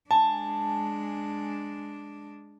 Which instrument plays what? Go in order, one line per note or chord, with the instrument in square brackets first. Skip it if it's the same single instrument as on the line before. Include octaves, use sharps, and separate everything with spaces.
[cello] G#3 D4 [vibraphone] G#5 [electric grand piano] A5